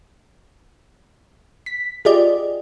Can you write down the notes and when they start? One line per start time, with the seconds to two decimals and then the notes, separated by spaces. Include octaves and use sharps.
1.66 B6
2.05 F4 G4 G#4 D5 D#5